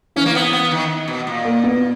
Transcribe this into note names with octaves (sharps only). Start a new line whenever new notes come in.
E3 C#4
A#3
B3
B3
D#3
B2
A#2
A#3
B3